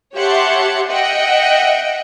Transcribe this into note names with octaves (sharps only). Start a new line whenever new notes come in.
G4 C#5 E5 F#5 A5 C6
D#5 E5 F#5 G5